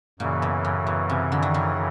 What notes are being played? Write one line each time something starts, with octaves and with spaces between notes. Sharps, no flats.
F#2 A#2 C#3 E3
B2
A2
B2
C3
D3
D#3
D#3